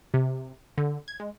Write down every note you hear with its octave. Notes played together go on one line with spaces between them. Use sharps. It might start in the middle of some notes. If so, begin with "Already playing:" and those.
C3
D3
G#6
G#3